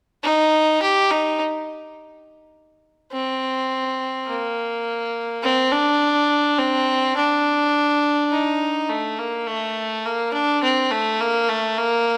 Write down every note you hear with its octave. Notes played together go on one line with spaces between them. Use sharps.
D#4
G4
D#4
C4
A#3
C4
D4
C4
D4
D#4
A3
A#3
A3
A#3
D4
C4
A3
A#3
A3
A#3